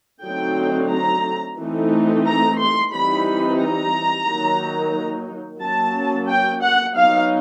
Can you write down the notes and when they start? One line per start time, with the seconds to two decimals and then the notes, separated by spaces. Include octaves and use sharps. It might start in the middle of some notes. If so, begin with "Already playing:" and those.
0.23 D3 F#3 A3 C4 D#4 G5
0.91 A#5
1.58 E3 A3 C4 D#4
2.25 A#5
2.58 C6
2.92 E3 G3 C4 D#4 B5
3.59 A#5
4.27 D#3 F#3 A#3 D#4
5.61 F#3 A#3 C#4 A5
6.28 G5
6.62 F#5
6.95 F#3 B3 D#4 F5